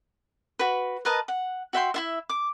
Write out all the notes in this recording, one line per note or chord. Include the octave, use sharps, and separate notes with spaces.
F#4 B4
A#4 B4 D#5 A5
F#5
F#4 E5 G5 C6
E4 F4 E5
D6